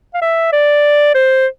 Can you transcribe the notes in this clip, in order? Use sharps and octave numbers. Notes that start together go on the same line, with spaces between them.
F5
E5
D5
C5